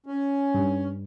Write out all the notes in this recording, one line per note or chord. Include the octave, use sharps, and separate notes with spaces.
C#4
G2